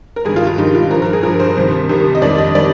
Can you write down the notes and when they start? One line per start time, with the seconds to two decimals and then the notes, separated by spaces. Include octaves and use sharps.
0.16 A#4
0.25 G2 D#3 G3 G#4
0.36 F4
0.47 F4
0.58 G2 D#3 G3 D#4
0.75 F4
0.90 G2 F3 A#4
1.02 A#4
1.13 G#4
1.23 G2 F3 A#4
1.40 C5
1.57 C2 C3 D#3 G3
1.89 C2 C3 D#3 G3
2.15 D#5
2.22 F2 D#3 G3 D5
2.38 D#5
2.55 D#3 G3 D5